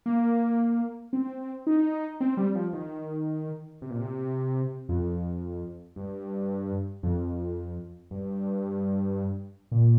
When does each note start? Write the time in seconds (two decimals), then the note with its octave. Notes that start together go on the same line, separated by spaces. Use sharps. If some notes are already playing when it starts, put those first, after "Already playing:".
0.06 A#3
1.13 C4
1.67 D#4
2.21 C4
2.37 G3
2.55 F3
2.73 D#3
3.82 C3
3.90 A#2
4.00 C3
4.89 F2
5.96 G2
7.03 F2
8.11 G2
9.72 A#2